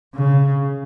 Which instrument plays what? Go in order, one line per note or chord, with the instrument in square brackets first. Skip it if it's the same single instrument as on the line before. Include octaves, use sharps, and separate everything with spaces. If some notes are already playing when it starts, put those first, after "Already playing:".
[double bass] C#3